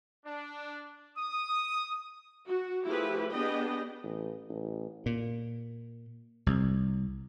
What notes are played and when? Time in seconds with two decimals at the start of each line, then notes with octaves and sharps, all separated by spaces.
0.25 D4
1.16 D#6
2.47 F#4
2.85 F3 A3 E4 G4 G#4 B4
3.31 B3 D4 G4 G#4 D#5 G5
4.03 A1
4.50 A1
5.06 A#2
6.46 C2